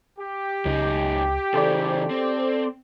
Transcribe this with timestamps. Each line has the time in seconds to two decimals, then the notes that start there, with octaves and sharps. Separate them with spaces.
0.19 G4
0.65 C#2 F#2 D#4
1.54 C#3 E3 A4 C5 D5
2.10 C4